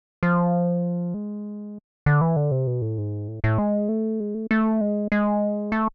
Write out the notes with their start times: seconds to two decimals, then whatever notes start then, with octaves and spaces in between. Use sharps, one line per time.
0.23 F3
1.14 G#3
2.06 D3
2.21 E3
2.36 D3
2.51 C3
2.67 B2
2.82 A2
2.98 G#2
3.28 A2
3.44 A2
3.58 G#3
3.89 A3
4.20 G#3
4.34 A3
4.51 A3
4.81 G#3
5.12 G#3
5.72 A3